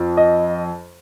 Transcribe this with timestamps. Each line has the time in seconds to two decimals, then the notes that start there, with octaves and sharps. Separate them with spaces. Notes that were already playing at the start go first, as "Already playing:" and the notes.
Already playing: F2
0.17 D#5